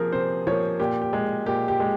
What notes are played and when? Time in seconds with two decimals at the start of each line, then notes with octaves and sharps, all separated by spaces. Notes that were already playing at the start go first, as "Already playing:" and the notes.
Already playing: C3 F3 A#3 G#4 A#4
0.12 C3 C5
0.47 F3 A#3 C#5
0.80 A#2 G4
1.02 G4
1.13 G#3
1.46 A#2 G4
1.68 G4
1.80 G#3